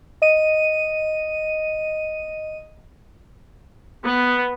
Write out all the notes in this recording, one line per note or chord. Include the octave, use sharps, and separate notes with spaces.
D#5 D#7
B3